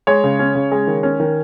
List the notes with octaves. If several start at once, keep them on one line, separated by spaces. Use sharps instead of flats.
G#3 C#5
C#3
C#4
C#3
G#3
D#3
C#4
D#3